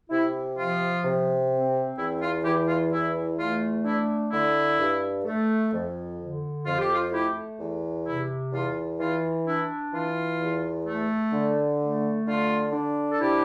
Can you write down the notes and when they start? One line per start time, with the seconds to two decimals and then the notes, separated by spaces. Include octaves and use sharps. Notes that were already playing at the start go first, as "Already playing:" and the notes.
0.10 C3 E4
0.57 F3 F4
1.04 C3
1.51 C4
1.97 E2 E4
2.20 F4
2.44 E3 E4 G4
2.67 F4
2.91 E2 E4
3.37 A3 F4
3.84 D4 E4
4.31 D3 E4
4.78 G2
5.25 A3
5.72 F2
6.18 D3
6.64 F2 F4
6.78 G4
6.92 F4
7.11 A3 E4 G4
7.59 E2
8.05 C3 E4
8.51 E2 F4
8.99 E3 F4
9.45 D4 E4
9.92 E3 F4
10.39 E2
10.85 A3
11.32 D3
11.79 A3
12.26 D3 F4
12.72 D4
13.11 A4
13.19 C3 E4 G4